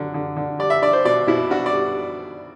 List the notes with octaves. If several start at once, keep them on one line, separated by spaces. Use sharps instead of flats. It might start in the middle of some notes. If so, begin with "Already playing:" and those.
Already playing: D3 F#3
D3
D3
G3 D5
E5
D4 D5
C5
B2 D5
B2 E4
D4 F#4
D5
G3